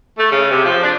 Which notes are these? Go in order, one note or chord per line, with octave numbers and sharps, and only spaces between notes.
A3
C#3
C3
F3
D4